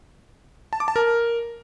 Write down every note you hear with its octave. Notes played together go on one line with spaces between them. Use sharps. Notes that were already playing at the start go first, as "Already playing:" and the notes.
A5
D6
A5
A#4